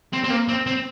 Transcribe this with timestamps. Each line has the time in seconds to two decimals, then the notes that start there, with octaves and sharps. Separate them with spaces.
0.13 C4
0.24 C4
0.30 A#3
0.48 C4
0.66 C4